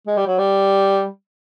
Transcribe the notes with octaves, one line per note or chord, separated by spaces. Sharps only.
G#3
G3
F#3
G3